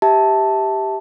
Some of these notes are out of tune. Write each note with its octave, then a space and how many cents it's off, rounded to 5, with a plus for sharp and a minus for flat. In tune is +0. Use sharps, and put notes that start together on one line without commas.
G4 +0 E5 -20 A5 +0